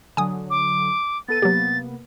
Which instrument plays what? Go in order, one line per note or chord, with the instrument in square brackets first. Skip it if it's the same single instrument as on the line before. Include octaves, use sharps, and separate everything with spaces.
[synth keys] D3 F#3 [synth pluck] G#5 D#6
[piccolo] D6
[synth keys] B3 A4 D#7 [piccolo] A6
[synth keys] C3 A#3 B3 [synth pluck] F#3 G4